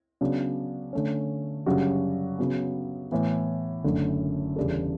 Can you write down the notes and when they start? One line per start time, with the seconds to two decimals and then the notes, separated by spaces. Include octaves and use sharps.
0.21 C#3 F#3 B3 D4
0.93 D3 A3 C#4
1.66 F#2 C#3 G3 D4 F#4
2.39 C#3 F#3 B3
3.11 A2 E3 B3
3.84 F#1 F#2 D3 A3
4.56 E2 C#3 G3 D4 A4